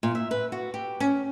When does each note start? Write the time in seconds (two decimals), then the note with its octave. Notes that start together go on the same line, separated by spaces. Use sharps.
0.03 A#2
0.15 E5
0.31 B4
0.52 F#4
0.74 G4
1.00 C#4